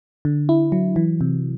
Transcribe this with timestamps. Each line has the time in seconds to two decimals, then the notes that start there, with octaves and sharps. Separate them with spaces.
0.25 D3
0.49 E4
0.72 F#3
0.96 E3
1.21 C3